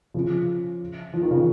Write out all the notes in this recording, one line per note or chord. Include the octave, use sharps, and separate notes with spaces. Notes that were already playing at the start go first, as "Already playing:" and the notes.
C#3 F3
F3
D#3
C#3 F3